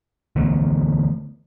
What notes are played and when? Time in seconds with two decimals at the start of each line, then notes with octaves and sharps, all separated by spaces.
0.36 D3 E3 A3 B3